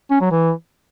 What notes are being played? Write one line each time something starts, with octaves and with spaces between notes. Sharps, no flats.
C#4
F#3
E3